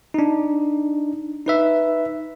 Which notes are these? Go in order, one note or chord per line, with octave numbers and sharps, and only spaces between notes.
D4 D#4
D#4 B4 E5